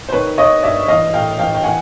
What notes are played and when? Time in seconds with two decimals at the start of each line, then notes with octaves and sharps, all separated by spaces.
0.09 C5
0.12 D#3 B4 C#5
0.38 D#3 C#5 D#5
0.63 G2 D5 E5
0.88 E3 D#5 F5
1.13 A2 F5 G5
1.39 E3 F5 G5
1.55 G5
1.64 E3 F#5 G#5